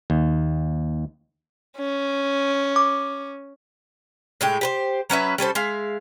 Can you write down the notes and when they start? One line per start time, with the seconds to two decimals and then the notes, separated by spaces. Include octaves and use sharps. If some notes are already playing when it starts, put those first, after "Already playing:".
0.10 D#2
1.78 C#4
2.76 D6
4.41 A2 G#3 G4
4.61 G4 B4 C5
5.10 F#3 C#4 B4 E5
5.38 G3 C#4 A4 C5
5.55 G#3 E5 F5